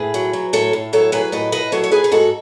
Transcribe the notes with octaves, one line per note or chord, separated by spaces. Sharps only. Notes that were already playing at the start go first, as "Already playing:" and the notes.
Already playing: A2 G#4 B4
F#3
F#3
A2 A4 C#5
A2
F#3 A4 C#5
F#3 G#4 B4
A2 B4 D#5
A2 B4 D#5
F#3 A4 C#5
C#5
F#3 G#4 B4
B4
G#2 F#4 A4